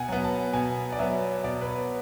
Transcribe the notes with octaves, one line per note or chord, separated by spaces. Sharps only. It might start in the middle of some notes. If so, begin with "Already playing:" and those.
Already playing: B2 F#5 G#5
F#3 B3
A5
B2 G#5
D5
F#3 B3 E5
B2 D5
B4
C#5